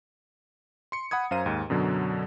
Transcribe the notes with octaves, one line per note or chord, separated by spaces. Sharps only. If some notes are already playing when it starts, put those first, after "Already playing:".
C6 C#7
F#5 B5 D#6 G#6
F#2 C5 F5 A#5 D#7
D#2 G#2
F#2 B2 D3 F#3